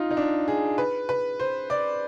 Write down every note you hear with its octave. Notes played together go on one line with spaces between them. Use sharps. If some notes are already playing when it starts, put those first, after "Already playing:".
Already playing: D#4 F4
D#4
D4
G#4
B4
B4
C5
D5